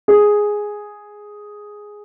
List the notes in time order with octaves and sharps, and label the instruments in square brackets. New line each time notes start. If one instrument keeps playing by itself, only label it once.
[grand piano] G#4